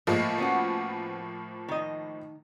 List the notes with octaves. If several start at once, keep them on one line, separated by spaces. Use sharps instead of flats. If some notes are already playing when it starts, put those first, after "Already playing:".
A2 F3 G#3 A#3
B3 C#4 F#4
D#3 D#5